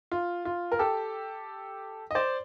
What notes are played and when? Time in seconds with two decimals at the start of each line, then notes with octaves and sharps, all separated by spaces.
0.12 F4
0.45 F4
0.72 A#4
0.79 G4 A4
2.11 D#5
2.15 C5 D5